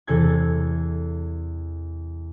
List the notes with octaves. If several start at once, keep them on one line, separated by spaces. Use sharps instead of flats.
E2 C3 A4 A5 G#6